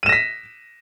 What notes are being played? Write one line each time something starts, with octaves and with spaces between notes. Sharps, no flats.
A#6 B6 D#7 E7